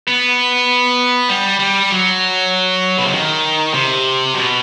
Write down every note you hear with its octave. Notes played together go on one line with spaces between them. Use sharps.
B3
G3
G3
F#3
B2
C3
D#3
C3
B2